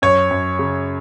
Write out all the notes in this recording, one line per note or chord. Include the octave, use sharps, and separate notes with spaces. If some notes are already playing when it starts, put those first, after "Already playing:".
F#2 C#5
F#2
C#3